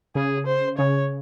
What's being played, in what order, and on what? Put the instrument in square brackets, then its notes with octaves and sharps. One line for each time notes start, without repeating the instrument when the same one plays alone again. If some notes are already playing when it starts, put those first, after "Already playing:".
[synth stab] C#3 [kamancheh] G#4
[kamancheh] C5
[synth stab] C#3 [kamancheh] C#5